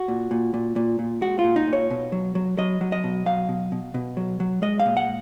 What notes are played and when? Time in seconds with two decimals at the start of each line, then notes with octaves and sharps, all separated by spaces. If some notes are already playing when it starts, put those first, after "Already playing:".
Already playing: F#4
0.08 A#2
0.31 A#2
0.54 A#2
0.76 A#2
0.99 A#2
1.21 G#3 F#4
1.39 F4
1.44 A#2
1.56 D#4
1.67 A#2
1.73 C#5
1.90 B2
2.12 F#3
2.35 F#3
2.58 F#3 D#5
2.81 F#3
2.92 D#5
3.04 B2
3.26 F#3 F5
3.49 B2
3.72 B2
3.94 B2
4.17 F#3
4.40 F#3
4.62 G#3 D#5
4.80 F5
4.86 A#2
4.97 F#5